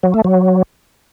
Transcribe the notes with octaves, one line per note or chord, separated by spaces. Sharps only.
F#3
A3
F#3